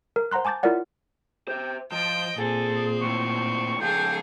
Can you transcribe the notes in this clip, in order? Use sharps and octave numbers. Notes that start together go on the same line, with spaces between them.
A#4
C5 F#5 A#5 C6 F#6
G#5 A5 D6 G6 A6
E4 F4 A#4 C#5 D5 F#5
C5 E5 G5
F3 C5 D#5 G5
A#2 C4 G#4 A4
D#2 A2 C#6
C#3 F3 G#4 A4 F5 G5